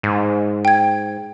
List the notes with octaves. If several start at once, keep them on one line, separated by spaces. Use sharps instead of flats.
G#2
G5 G#6